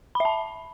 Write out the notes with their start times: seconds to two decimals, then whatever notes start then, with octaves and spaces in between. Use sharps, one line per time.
0.15 B5
0.20 E5
0.25 A5